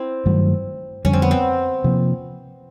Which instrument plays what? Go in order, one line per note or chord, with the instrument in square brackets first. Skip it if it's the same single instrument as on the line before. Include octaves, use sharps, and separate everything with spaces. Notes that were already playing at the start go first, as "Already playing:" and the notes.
Already playing: [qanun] C4 E4
[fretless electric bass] G2 D#3 F#3 A3
[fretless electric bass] F2 D3 G3 [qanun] C#4
[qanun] C4
B3
C4
[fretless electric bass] C3 F3 A#3